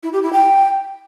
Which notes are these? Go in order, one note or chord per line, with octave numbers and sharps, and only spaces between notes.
E4
G4
E4
G5